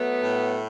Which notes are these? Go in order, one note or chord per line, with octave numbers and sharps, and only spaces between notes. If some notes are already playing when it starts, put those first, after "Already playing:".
Already playing: F#3 A3 B3
A2